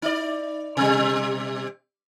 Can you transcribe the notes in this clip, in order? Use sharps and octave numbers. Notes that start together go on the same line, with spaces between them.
D#4 D5
B2 G3